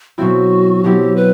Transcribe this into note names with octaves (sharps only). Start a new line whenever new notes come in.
B2 F#3 C4 E4 F#4
B2 F#3 C4 E4 G4
B4